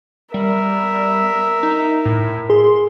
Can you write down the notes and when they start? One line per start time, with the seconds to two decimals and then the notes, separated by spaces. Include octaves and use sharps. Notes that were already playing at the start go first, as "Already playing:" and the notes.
0.34 G3 A#4 E5
1.63 D#4
2.05 A2
2.50 G#4 C6